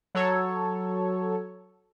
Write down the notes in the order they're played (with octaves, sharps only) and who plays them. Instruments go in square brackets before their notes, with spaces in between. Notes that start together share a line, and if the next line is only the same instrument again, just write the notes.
[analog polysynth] F#3 A4 C#5